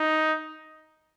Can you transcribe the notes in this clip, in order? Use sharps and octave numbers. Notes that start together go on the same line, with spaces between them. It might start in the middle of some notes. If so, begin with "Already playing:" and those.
Already playing: D#4